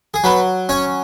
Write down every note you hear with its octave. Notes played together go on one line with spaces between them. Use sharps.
G#4
F#3 B4
C#4 C#5